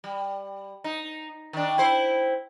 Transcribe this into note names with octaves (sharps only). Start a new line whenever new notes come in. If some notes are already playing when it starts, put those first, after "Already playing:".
G3
D#4
D#3 D4
E4 C5